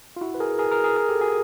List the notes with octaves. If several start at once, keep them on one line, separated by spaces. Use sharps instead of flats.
F4
E4 F#4
B4
G#4 A#4
G#4 A#4
G#4 A#4
G#4 A#4
G#4 A#4
G4 A4
F#4 G#4